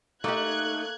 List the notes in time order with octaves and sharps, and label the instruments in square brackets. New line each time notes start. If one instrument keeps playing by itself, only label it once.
[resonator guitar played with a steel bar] A3 [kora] A#3 [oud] D#4 G4 [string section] F#6 G#6